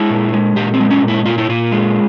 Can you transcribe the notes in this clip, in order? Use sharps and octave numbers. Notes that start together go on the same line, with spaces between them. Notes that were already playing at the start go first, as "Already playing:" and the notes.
Already playing: G#3 E4
A#2
G#3
A#2 G4
C4
G#3
C#4
A#2
E4
A#2 F4
E4
A#2 F4
G#3